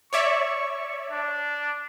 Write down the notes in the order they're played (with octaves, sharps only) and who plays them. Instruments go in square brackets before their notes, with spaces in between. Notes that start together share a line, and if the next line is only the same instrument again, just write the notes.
[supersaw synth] C#5 D5 E5 [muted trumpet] C#6
[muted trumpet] D4